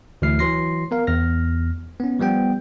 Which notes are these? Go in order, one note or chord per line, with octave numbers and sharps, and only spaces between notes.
D2 E3 F#3 E4 F6 C7
E3 F#3 C6 A#6 C7
B3 A#4 F5
E2 F6 A#6
B3 C#4
F3 G3 B3 G5